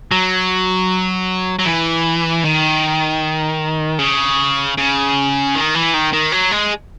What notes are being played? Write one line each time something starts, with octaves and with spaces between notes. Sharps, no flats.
F#3
F#3
E3
D#3
C#3
C#3
D#3
E3
D#3
D#3
F#3
G#3